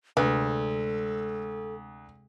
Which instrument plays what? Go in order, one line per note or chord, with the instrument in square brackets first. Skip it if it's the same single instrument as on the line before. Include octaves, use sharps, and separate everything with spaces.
[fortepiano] D2 [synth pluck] C3 G#3 [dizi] A4 [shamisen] B4